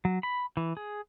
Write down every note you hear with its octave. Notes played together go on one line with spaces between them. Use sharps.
F#3
B5
E3
G#4